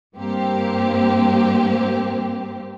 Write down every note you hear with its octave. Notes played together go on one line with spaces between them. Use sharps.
G2 A#3 C4 G4